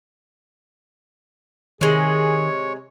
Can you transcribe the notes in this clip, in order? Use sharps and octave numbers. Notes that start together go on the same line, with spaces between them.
C3 D#3 G#3 G#4 C#5